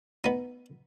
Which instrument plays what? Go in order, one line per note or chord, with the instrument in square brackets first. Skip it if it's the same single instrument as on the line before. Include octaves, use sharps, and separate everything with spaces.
[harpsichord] B3 D#4